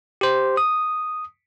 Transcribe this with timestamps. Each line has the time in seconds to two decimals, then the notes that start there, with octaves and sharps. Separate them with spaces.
0.21 G4 C5
0.57 D#6